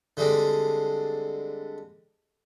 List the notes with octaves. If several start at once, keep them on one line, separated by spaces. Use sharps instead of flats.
D3 G3 G#3 C4